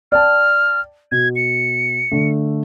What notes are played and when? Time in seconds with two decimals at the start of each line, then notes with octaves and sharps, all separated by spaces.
0.12 D5 G5 A5 F6
1.12 B2 G#6
1.36 C#7
2.12 D3 A3